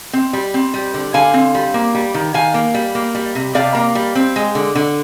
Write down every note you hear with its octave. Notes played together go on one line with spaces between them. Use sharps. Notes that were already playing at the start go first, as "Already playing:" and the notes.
C4
G3
C4
G3
D3
D3 F5 G#5
C4
G3
A#3
G3
D#3
D#3 F5 G#5
A#3
G3
A#3
G3
C3
C3 D5 F5
A#3
G3
C4
G#3
D3
D3